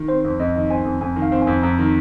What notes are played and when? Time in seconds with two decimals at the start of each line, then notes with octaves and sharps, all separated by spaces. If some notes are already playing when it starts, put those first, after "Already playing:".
Already playing: D#3
0.08 C4 C5
0.24 F2
0.39 F2 D#5
0.55 D#3
0.70 C4 G#5
0.85 F2
1.01 F2 G#5
1.16 D#3
1.22 F5
1.32 C4
1.42 G#5
1.47 F2
1.63 F2 A#5
1.78 D#3